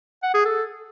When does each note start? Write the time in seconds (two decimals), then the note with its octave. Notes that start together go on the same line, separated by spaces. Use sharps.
0.23 F#5
0.34 G#4
0.45 A4